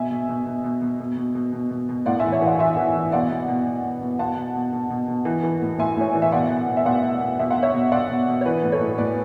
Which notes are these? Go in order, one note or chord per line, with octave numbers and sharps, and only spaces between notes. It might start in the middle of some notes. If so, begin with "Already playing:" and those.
Already playing: B2 E5 G#5
B2
B2
B2
B2
B2
B2
B2
B2
B2
B2
B2
A2 D5 F#5
E3 E5 G#5
C#5 E5
E3 D5 F#5
E3 E5 G#5
E3
E3
B2 D5 F#5
B2
B2
B2
B2
B2
B2 F#5 A5
B2
B2
B2
B2
B2
E3
E3
A2
A2 E5 G#5
A2 C#5
E3 D5
E5
B2 D5 F#5
B2
B2
E5
B2 D5 F#5
B2
B2
B2 E5
F#5
B2
C#5 E5
B2
B2 D5 F#5
B2
B2
C#5
E3 B4 D5
A2
A4 C#5
A2
A2 B4 D5